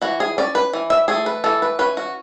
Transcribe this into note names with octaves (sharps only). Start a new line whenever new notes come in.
E3 F#4
G#4
C#4 D5
B4
E3
E5
A3 G#4
B4
E3 A4
B4
C#4 B4
F#4